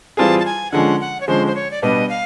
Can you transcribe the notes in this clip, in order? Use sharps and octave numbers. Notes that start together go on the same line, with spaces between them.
E3 G3 C4 F4 G#4 A5
A5
G#5
D3 F3 G#3 C#4 F#5
F#5
C#5
D3 F3 G#3 C#4 C5
C5
C#5
D5
B2 G3 B3 D4 D#5
F5